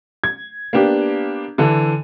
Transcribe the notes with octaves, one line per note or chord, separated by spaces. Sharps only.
G#6
A#3 B3 D4 G4
D3 E3 A4